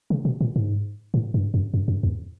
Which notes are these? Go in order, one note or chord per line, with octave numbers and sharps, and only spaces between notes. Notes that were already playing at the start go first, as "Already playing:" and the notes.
C#3
B2
A#2
G#2
A2
G2
F#2
F#2
F#2
E2